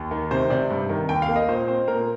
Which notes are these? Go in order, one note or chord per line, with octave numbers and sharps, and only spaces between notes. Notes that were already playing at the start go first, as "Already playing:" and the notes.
Already playing: D#2
D#3
C3 C5
C3 D5
G2
D#3
D#2 G5
F5
A#3
D#5
A#2 C5
C4 C5
A#2 A#4